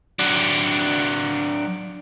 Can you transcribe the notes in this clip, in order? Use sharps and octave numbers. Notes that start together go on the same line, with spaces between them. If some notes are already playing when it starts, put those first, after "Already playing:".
F#3 D4